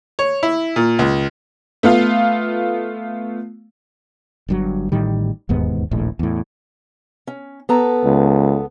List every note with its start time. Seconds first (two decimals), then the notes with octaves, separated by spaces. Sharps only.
0.19 C#5
0.43 E4
0.76 A#2
0.99 C#2
1.83 A3 B3 F4 F5
4.48 G1 G2 F#3
4.92 A1 A2 D#3 G3
5.49 E1 D#2 G#2 B3
5.91 D#1 A#1 A2
6.19 E2 A2
7.27 C#4
7.69 B3 A4 A#5
8.05 C#2